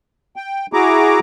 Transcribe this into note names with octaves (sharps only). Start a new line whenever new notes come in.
G5
E4 F#4 G#4 A#5 D6